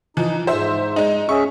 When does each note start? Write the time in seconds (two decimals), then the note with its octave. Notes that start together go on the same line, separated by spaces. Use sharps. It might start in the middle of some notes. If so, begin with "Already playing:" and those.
0.17 E3 F3 D#4
0.47 G#2 C5 E5
0.96 G#3 D#4
1.29 C#4 G#4 E5 C#6